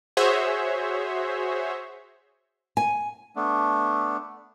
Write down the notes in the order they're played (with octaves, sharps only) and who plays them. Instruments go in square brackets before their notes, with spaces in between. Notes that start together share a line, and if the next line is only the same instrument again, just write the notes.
[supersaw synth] F#4 G#4 C5 C#5 E5
[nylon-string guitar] G#5
[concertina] A3 B3 D4